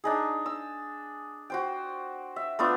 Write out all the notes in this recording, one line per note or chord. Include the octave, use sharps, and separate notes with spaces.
D4 D#4 G#4
E6
F#4 C5 G5
E5
A3 B3 D4 F4